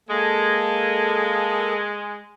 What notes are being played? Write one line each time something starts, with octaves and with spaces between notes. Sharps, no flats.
G#3 A#3 A4